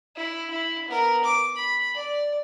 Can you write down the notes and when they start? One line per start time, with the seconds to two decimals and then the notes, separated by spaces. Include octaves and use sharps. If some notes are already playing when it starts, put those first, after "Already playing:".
0.16 E4
0.51 E4
0.88 B3 A#4
1.25 D6
1.57 B5
1.96 D5